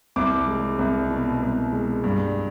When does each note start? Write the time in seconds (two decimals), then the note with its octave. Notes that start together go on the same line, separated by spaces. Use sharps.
0.16 C2 D6
0.48 G#3
0.79 C2
1.11 B2
1.42 C2
1.73 G#3
2.04 G2